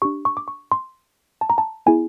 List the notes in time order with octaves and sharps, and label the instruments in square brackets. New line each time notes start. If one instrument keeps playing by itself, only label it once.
[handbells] D4 G4 C#6
C#6
D6
C#6
C6
A5
A#5
A5
B3 E4 G#4 G#5